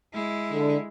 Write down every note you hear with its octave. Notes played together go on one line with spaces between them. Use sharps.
G#3 E4
D3